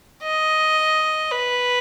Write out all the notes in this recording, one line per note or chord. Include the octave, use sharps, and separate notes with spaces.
D#5
B4